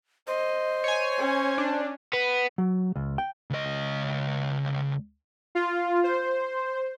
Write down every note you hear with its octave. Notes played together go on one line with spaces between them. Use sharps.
C5 D#5
C#5 G#5
C#4
D4
B3
F#3
C#2
G5
C#2 D#5
F4
C5